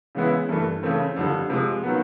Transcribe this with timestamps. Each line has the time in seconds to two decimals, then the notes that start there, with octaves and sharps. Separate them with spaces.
0.15 C#3 E3 G#3 B3 E4
0.49 G2 E3 A3
0.83 C#3 E3 A3 C4
1.16 F2 D3 G3
1.50 C3 F3 G#3
1.83 D#3 F#3 B3